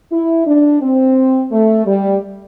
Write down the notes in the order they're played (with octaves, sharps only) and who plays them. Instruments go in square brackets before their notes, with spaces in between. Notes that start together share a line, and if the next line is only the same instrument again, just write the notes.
[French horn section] E4
D4
C4
A3
G3